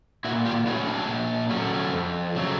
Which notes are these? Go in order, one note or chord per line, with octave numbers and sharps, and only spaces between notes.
A#2 E4 F#4
F4 G4
F#3 A3 C#4 E4 F#4
D4
A#2
F#3 A3 C#4
F2
C#3 F#3 A3